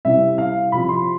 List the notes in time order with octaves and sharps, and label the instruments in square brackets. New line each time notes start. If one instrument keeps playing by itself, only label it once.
[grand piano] C3 G3 C4 E4 E5
F5
C3 F3 C4 B5
C6